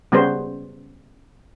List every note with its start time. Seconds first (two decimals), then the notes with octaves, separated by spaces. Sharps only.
0.12 C#3 G3 B3 C#4 G#4 C5